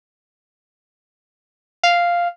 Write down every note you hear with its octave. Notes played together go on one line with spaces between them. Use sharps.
F5